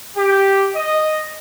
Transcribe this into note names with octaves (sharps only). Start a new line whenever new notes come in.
G4
D#5